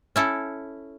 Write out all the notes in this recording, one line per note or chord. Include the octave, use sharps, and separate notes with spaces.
C#4 E4 A4